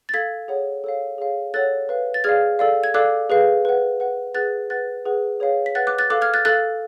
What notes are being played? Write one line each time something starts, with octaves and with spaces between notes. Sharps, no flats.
A6
A4 F5 G#6 B6
G#4 C#5 F#5
A4 C#5 F5
G#4 C#5 F5
A4 C#5 F#5 F#6 A6
B4 F5
A6
G#4 D5 F5 F6 G#6
A4 D5 F5
G#6
A4 D5 F5 D6 F#6
G#4 B4 F5
B4 F#5
B4 F#5
G#4 B4 F#5 F#6 A6
B4 F#5 F#6 A6
G#4 B4 F#5
G#4 C#5 F5
B6
B4 F#5 F#6 A6
D6 F#6
F#6 A6
A4 F5 D6 F#6
F6 G#6
F#6 A6
A4 F5 F#6 A6